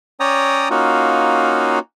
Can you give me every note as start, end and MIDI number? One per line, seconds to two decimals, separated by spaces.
0.20 0.68 61
0.20 0.68 73
0.20 0.68 74
0.20 0.68 79
0.20 0.68 82
0.20 0.68 87
0.71 1.79 58
0.71 1.79 61
0.71 1.79 63
0.71 1.79 65
0.71 1.79 66